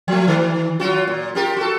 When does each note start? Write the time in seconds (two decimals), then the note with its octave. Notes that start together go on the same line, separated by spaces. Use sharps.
0.08 F3 A3
0.28 D#3
0.80 F#3 F4 F#4
1.07 A#2
1.35 F4 G4 A#4
1.57 F#4 A4